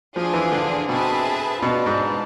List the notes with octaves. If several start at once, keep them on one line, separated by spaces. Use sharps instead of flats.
F3 D4 F4 G#4
E3
D3
B2 C4 G#4 B4 E5 A5
B2 F4 B4 D5 A5
G#2